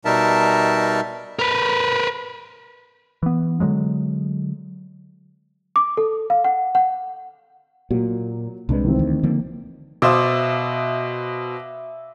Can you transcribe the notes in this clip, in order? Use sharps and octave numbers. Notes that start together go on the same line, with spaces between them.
B2 G3 D#4 A#4 E5 A5
A#4 B4
E3 B3
D3 D#3 F#3 G#3
D6
A4
F5
F#5
F#5
A#2 F#3 A#3
C2 C3 G#3 D4 B4
D#3 E3 C4
D2
D3 F3 A#3
B2 C5 D5 E5 F5 D#6